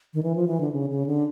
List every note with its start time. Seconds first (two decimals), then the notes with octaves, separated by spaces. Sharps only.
0.14 D#3
0.23 E3
0.36 F3
0.48 E3
0.61 D3
0.72 C#3
0.90 C#3
1.06 D3